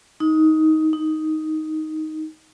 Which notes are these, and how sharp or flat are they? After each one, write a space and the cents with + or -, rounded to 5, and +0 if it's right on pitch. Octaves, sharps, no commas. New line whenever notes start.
D#4 +15
D#4 +5